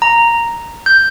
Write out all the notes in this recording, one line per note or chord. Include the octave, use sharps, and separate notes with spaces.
A#5
G6